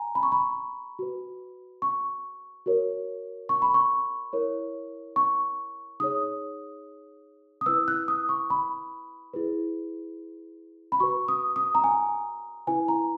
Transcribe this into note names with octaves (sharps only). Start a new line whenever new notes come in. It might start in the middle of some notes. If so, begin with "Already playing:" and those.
Already playing: G#5 A#5
B5
C#6
B5
F#4 B4
C#6
F#4 A#4 C#5
C#6
B5
C#6
E4 A#4 C#5
C#6
D#4 G#4 C#5 D#6
D#6
E4 B4 E6
F#6
D#6
C#6
B5
E4 G#4 B4
B5
F#4 B4 C#6
D#6
D#6
A#5
G#5
E4 B4 G#5
A#5